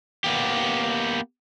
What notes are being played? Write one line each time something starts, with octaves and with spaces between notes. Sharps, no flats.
A#3 B3 G4